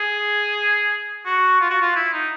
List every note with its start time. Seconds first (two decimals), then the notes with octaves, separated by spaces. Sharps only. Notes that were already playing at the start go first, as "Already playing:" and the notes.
Already playing: G#4
1.26 F#4
1.61 F4
1.70 F#4
1.81 F4
1.96 E4
2.13 D#4